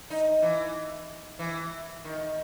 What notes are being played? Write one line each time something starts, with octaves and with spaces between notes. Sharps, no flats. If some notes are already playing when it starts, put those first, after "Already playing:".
D#4
E3
E3
D#3